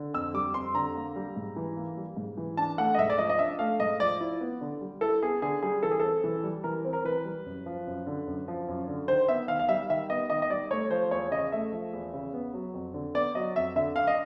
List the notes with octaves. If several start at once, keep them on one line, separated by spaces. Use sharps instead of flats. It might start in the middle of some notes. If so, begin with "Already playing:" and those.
Already playing: D3
F2 E6
G3 D6
F2 C6
D3 A#5
A#3
G3
G#2
E3
A#3
G3
G#2
E3
D4 A5
A3 F#5
D#5
G#2 E5
D5
F3 D#5
D#5
D4 E5
A3 F5
G#2 D#5
F3 D5
E4
B3
D3
G3
E4 A4
B3 G#4
D3 G#4
G3 G#4
E3 A4
G#4
C4 A4
E3
G3
E3 A#4
C4
A#4
E3 B4
G3
F#2
F3
F#2
D3
F#2
F3
F#2
D3
D#3 C5
B3 E5
D#3 F5
F5
G3 E5
D#3 E5
B3 D#5
D#3 D#5
D#5
G3 D5
A3 C#5
F3 C5
E2 C#5
C#3 D#5
A3 E5
F3
E2
C#3
B3
F#3
F2
D3
B3 D5
F#3 D#5
F2 E5
D3 E5
D4 F5
D#5